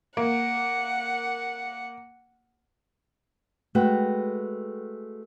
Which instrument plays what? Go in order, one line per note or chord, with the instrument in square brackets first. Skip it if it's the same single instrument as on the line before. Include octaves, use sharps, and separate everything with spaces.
[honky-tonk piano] A#3 [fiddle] F#5
[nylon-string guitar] G#3 A3 F#4 B4 G5